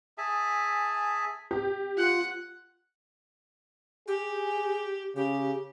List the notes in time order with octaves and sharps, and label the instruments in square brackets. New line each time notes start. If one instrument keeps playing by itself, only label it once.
[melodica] G#4 E5 G#5 A5
[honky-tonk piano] G4
[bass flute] F4 [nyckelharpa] F#5
[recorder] G4 [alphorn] G#4
[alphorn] C#3 [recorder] G4